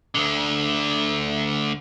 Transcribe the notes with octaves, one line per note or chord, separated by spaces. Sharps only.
D2 D3